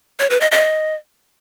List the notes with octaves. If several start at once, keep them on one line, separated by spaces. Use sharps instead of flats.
C#5
B4
D#5
D#5